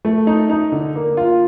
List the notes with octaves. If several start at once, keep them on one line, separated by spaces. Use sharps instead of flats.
A3
D#4
D#4
D3
A#3
F4